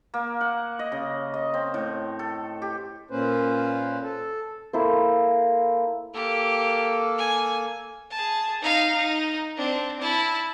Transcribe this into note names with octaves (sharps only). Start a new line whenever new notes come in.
A#3
F#5
D#5
C#3
D#5
C4
A2
A4
G4
A#2 A#3 C#4 B4 C5
A4
A#3 E4 A4 C5
A#3 G4 A4
G#5
G#4 A5
D#4 F5
D#4
C4 D4
E4 A5